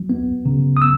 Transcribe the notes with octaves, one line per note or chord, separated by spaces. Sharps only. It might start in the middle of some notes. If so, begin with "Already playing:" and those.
Already playing: F#3
B3
C#3
D#6
E6